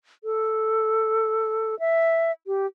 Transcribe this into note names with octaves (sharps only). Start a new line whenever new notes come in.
A4
E5
G4